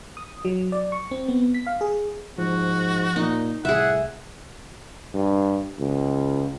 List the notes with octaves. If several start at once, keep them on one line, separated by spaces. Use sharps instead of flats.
D#6
F#3
D5
C#6
C4
B3
B6
F5
G#4
G#2 F3 F#4
A#2 D#4
C2 A2 G#4 E5 F#5
G2
C#2